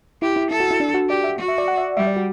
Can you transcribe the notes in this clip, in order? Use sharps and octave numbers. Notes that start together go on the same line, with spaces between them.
E4 G4
E4
E4 A4
F#4
E4
D4
F#4
G4 D5
E5
F#4
E5
D5
F#5
E5
G3 E5
D5
F#4